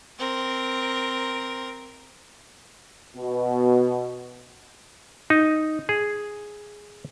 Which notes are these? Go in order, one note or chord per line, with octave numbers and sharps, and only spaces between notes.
C4 A#4
B2
D#4
G#4